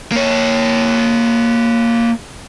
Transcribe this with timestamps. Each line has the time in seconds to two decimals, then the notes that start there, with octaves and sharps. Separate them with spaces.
0.12 A#3 C#5